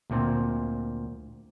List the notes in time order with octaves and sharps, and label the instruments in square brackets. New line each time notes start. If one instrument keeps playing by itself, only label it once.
[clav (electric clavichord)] D2 A#2 C4